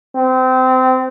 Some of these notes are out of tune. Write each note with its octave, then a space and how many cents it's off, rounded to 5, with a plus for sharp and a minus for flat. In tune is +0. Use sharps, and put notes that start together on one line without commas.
C4 -25